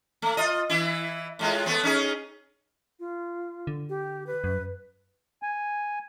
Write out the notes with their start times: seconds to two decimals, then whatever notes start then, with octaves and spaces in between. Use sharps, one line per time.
0.22 A3
0.37 F4 D#5
0.70 E3 E4
1.39 A2 G#3 F4
1.66 A3 B3 C4
1.83 C#4 D#4 G#4
3.00 F4
3.67 D3
3.89 G4
4.27 B4
4.44 F#2
5.43 G#5